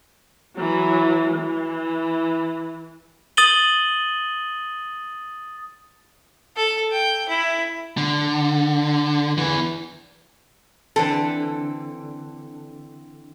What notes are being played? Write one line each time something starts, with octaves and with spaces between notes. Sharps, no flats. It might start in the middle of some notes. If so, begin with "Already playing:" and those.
E3 F#3
E3
D#6 A6 D#7 F#7 G7
A4
G5
E4
D3
E2 E3
D3 E3 C4 A4